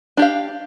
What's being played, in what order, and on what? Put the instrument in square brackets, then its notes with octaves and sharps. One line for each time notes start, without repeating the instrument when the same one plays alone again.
[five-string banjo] D4 G4 F5